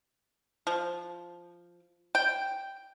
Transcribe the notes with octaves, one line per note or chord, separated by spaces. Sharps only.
F3
G5